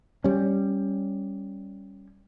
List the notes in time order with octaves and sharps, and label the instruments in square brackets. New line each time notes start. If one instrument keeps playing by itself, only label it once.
[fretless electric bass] G3 C#4